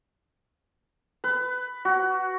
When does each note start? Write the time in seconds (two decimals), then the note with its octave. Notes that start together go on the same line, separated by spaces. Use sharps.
1.24 B4
1.85 F#4